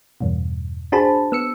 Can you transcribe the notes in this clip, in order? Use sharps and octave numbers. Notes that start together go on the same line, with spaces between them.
E2 G2 B2
D4 F#4 G#4 C5 A5 B5
B3 E6 C#7